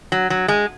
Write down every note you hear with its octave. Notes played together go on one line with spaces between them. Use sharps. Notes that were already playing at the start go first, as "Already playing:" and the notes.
F#3
F#3
G#3